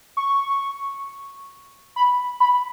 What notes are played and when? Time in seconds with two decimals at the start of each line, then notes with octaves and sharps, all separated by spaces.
0.17 C#6
1.96 B5
2.40 B5